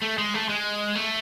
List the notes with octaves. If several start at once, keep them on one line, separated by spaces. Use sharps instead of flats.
A3
G#3
A3
G#3
A3